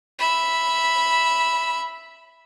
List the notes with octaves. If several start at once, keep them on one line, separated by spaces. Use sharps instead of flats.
E5 B5